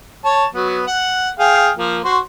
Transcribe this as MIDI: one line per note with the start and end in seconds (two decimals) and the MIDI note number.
0.25 0.46 73
0.25 0.46 81
0.55 0.82 54
0.55 0.82 59
0.87 1.29 78
1.39 1.71 68
1.39 1.71 77
1.39 1.71 79
1.77 2.00 53
1.77 2.00 58
2.05 2.19 66
2.05 2.19 72